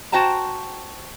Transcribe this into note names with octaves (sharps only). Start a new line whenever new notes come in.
F#4 C5 G5 A5 A#5